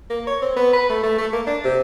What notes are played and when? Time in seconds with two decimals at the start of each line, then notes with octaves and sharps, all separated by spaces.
0.10 A#3
0.27 C#5
0.42 C4
0.56 B3
0.73 B4
0.89 A3
1.03 A3
1.18 A3
1.33 A#3
1.47 D4
1.64 C3